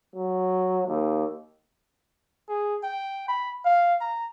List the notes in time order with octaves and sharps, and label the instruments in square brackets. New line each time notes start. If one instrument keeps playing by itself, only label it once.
[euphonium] F#3
D#2
[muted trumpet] G#4
G5
B5
F5
A#5